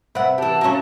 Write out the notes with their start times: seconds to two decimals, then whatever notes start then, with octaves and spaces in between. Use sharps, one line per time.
0.15 C3 B3 C4 B4 E5 F#5
0.38 E3 G4 A5
0.61 F#3 A#3 C#4 G#5 C#6